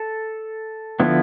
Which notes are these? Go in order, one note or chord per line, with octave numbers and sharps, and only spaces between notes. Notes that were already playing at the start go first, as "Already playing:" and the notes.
Already playing: A4
D3 F3 B3 E4